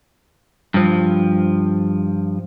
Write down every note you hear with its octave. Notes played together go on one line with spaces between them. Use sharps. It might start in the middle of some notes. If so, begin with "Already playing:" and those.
G2 F3